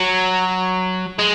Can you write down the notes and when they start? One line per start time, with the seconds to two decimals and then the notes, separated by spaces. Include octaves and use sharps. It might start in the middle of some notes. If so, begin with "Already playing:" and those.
Already playing: F#3
1.19 G#3